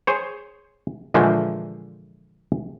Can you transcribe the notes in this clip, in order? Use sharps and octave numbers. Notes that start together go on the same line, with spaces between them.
G#4 C5 C#5
A#2 D3 E3 F3 G#3 A3